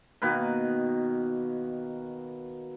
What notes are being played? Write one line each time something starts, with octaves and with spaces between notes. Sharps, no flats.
B2 D#3 A#3 B4